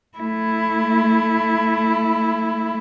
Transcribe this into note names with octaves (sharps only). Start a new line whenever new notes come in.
A3 E4